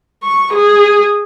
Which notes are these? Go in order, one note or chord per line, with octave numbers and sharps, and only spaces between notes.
C#6
G#4